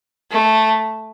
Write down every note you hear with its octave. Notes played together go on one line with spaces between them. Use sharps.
A3